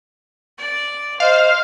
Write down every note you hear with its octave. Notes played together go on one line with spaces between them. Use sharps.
D5
C5 D#5 F5